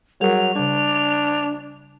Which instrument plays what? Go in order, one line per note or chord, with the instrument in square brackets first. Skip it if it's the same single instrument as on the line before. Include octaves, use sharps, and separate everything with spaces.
[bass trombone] F#3 [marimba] G3 G#4 A#4 [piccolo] F7
[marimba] C#3 G3 [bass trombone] D4